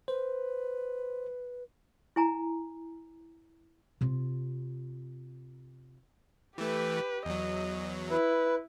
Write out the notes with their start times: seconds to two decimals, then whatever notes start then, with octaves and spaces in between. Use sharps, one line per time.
0.08 B4 C5
2.16 E4 G#5 A#5
4.01 C3 F4
6.58 E3 A3 G4 B4
7.25 E2 F#3 D#5
8.11 E4 B4